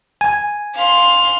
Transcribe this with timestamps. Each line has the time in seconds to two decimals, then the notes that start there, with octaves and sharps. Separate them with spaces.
0.21 G#5
0.75 F5 C6